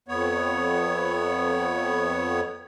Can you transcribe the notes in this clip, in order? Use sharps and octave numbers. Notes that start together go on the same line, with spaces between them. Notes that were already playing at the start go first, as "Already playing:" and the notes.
F2 B3 C#5